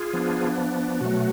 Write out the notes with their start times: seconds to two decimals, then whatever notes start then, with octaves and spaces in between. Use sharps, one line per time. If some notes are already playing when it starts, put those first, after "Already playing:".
Already playing: F4 G#4
0.13 F3 B3 D4
1.01 B2 F#3 A3 F#4